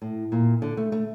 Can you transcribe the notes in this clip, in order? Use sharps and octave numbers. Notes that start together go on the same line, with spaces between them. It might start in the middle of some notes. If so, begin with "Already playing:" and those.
A2
A#2
D3
A3
A3